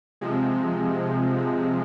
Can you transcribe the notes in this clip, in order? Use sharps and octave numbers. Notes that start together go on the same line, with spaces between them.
C3 F3 G#3